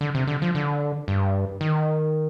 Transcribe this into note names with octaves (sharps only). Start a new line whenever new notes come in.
D3
C3
D3
F3
D3
G2
D#3